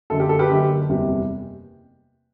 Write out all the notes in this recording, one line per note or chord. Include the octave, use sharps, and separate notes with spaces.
F#1 F#2 D3 A4
G4
A4
G4 B4
F#1 F#2 D3
F#1 E2 C3 G3